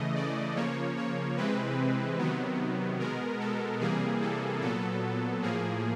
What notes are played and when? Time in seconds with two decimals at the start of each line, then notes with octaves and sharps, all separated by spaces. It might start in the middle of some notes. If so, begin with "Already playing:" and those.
Already playing: C#3 E3 A3 D#5
0.15 D5
0.56 C#3 F3 A#3 C#5
0.97 C#5
1.37 C3 E3 G#3 C4 B4
2.18 C3 D#3 F#3 B3
2.99 B2 G#3 B3 A#4
3.40 A4
3.80 C3 E3 G3 A#3 G#4
4.21 A4
4.61 A#2 F#3 B3 A4
5.42 A2 F3 A#3 G#4